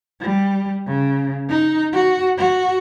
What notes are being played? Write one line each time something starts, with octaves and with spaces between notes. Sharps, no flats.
G3
C#3
D#4
F#4
F#4